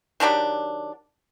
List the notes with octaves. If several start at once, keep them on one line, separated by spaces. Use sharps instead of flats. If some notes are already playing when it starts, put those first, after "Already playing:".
D#3 F#3 D4 G4